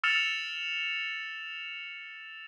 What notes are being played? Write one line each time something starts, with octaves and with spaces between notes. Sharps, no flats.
E6 F6 A6 C#7 E7 F7